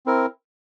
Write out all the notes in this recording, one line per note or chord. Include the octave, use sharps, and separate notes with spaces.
C4 E4 A#4